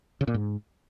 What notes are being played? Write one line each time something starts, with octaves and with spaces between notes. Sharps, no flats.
C#3
A#2
G#2